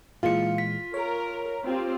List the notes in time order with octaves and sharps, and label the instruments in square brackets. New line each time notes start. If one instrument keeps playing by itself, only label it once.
[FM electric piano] A#2 E3 G#3 [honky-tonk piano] F4 [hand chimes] F5 C#7
[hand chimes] B6
[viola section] A#4 [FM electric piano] C#5
[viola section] C4 F4 G4